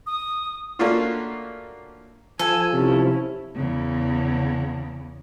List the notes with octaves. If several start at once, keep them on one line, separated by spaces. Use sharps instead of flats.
D#6
A3 A#3 C#4 D4 F4 F#4
F3 A4 G#5
C3 C#4 E4
E2 C#3